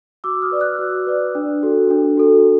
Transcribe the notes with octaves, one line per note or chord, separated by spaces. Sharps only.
F#4 D6 E6
D#6 F6
B4 D5
E6 F#6
F#4
B4 D5
D4
F#4 A4
D4
F#4 A4